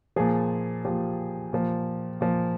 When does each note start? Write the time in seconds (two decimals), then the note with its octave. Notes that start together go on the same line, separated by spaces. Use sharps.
0.16 A#2 F3 G#4
0.85 A#2 F3 G4
1.53 A#2 F3
2.21 A#2 F3